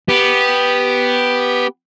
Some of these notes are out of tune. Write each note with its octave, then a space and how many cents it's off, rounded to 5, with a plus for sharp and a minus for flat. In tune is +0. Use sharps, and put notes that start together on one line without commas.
B3 +0 G4 +0